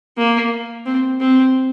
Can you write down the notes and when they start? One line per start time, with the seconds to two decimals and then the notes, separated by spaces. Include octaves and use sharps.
0.17 A#3
0.86 C4
1.20 C4